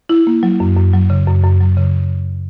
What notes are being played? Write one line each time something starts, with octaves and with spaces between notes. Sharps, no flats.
E4
A#3
F#3
F#2
F#2
F#3
C#3
F#2
F#2
F#3
C#3